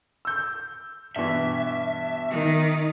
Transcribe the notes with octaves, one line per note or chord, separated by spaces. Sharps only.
E6 G6
G2 B2 E3 E5
D#3